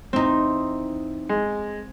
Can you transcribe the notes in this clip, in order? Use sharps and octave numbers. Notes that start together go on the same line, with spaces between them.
E2 C4 D#4
G#3